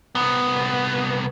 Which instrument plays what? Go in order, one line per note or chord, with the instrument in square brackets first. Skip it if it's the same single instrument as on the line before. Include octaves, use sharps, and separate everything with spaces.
[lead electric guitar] C2 B3